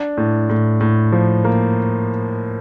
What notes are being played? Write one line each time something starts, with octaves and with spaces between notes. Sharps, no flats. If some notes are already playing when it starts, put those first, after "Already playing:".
Already playing: D4
A2
A2
A2
F3
A#3